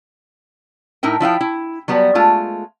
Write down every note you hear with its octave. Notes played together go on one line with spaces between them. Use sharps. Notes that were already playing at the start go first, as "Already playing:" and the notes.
A2 D#4 E4 A#4 G5
F3 E4 F5 G5
E4
F#3 G3 B3 F#4
G#3 A3 F4